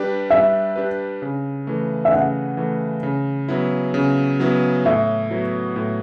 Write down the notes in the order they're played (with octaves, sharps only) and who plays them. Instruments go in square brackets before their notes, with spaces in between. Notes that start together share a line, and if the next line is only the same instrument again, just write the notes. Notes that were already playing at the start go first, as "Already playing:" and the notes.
Already playing: [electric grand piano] G3 D4 G4 B4
[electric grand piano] G3 [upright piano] E5
[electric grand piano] D4 G4 B4
C#3
E3 A3
[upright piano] E5
[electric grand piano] C#3 [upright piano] F#5
[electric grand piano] E3 A3
C#3
F#3 B3 E4
C#3
F#3 B3 E4
[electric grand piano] A2 [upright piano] E5
[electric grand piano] F#3 B3 E4
A2